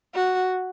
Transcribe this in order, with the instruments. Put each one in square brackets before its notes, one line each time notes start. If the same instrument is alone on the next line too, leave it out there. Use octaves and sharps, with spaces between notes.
[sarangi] F#4